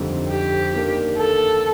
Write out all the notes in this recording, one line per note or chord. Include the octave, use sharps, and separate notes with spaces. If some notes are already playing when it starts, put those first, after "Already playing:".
Already playing: F2 D3 G3 C4 D#4
G4
D#3 A#3 D4
A4